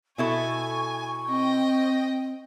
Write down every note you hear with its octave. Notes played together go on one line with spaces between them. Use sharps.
B2 E4 A4 G#5 C#6
C4 D#5 G5